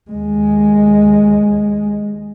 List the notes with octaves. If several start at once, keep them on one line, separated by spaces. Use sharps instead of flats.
D#2 G#3